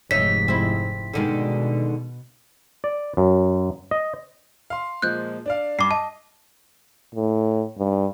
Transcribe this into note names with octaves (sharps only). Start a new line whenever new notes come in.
F1 G#2 D#4 C#5 E5 B6
C4 E4
B2 D3 D#3 G#3
D5
F#2
D#5
F5 C6
A#2 F3 G#3 F#6 G6
D4 D5 F5
G2 D6 C7
D#5 A5
A2
G2